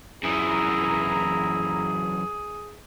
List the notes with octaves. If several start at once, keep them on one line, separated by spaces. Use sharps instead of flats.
F#2 E3 E4 G#4 A#5